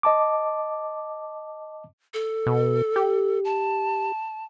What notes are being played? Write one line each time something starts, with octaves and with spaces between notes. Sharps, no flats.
D#5 A5 D6
A4
B2
G4
A5